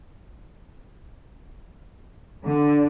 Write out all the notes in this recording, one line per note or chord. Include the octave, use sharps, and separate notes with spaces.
D3